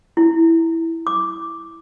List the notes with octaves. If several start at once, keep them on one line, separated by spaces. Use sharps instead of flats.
E4
D6